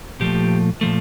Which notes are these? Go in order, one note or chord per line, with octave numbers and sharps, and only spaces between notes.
A#2 F3 A3 G4
A#2 F3 A3